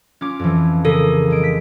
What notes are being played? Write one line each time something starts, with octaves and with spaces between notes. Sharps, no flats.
C#4 F4 D6
F2 E3
C#3 A4 A#4
G#3 D7
B6